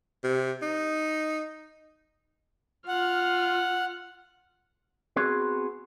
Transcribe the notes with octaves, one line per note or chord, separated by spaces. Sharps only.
C3
D#4
F4 F#5 F6
B3 C4 F#4 G#4